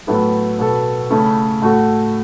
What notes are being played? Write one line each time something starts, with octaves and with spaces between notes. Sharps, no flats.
A2 F#3 B3 E4 A4
B2 B3 A4
C#3 A3 C#4 E4 A4
A2 A3 F#4 A4